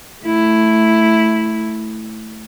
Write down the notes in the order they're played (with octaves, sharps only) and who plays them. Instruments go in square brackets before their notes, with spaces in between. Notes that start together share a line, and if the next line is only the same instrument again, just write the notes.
[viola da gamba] A3 E4